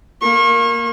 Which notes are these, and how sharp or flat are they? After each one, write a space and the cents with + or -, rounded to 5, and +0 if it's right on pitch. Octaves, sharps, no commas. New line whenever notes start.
A#3 +0 C#6 -40